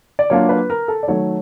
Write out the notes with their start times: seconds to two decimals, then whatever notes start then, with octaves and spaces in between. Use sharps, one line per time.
0.19 D5
0.30 F#3 A#3 D4 F4 C#5
0.49 B4
0.70 A#4
0.88 A4
1.03 D5
1.07 D#3 F#3 A3 C#5